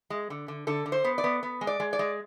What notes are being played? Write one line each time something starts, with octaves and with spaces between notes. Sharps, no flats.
G#3
D3
D3
D3 A4
D3
C5
B3
D5
B3
B3
G#3
D5
G#3
D5
G#3